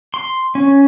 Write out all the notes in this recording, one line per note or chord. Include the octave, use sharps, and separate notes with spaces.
C6
C#4